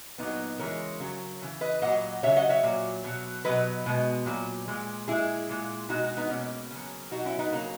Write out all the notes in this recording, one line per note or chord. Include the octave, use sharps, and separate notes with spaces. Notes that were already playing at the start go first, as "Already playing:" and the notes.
A#2 F#3 B3 D#4
C#3 E3 G#3 A#4 C#5
C#3 F#3
C#3 E3
B4 D#5
A#2 F#3 D#5 F#5
C#3 F#3 C#5 E5
D#5 F#5
C#5 E5
A#2 F#3
B2 F#3
B2 F#3 B4 D#5
B2 G#3
A#2 F#3
A#2 G#3
A#2 G#3 E4 G#4
A#2 G#3
B2 G#3 D#4 F#4
D#4 F#4
B3 D#4
B2 G#3 A#3 C#4
C#3 F#3
B2 F#3 D#4 F#4
C#4 E4
B3 D#4
C#3 F#3 A#3